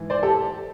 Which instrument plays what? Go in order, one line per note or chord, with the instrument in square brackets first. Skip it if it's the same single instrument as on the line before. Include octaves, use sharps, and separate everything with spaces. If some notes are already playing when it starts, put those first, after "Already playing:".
Already playing: [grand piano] G#2 E3
C5 D5
G4 A4